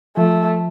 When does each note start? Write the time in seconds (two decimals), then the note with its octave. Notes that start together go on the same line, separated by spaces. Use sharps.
0.17 F3 A3